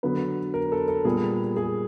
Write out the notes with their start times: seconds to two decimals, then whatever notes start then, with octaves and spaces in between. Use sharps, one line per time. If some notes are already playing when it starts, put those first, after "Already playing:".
0.03 D3 F#3 B3 B4
0.54 A#4
0.72 A4
0.88 A4
1.05 A#2 G3 B3 G#4
1.57 G#4